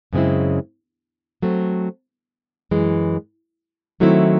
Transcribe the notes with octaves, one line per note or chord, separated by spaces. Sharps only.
F#2 C#3 G#3 C4 E4
F#3 A3 C4
F#2 E3 G#3
D#3 F#3 A3 C4 E4